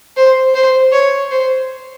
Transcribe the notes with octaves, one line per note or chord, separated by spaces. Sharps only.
C5
C5
C#5
C5